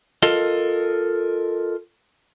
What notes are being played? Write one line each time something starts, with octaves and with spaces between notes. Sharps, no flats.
F4 A4 A#4 D#5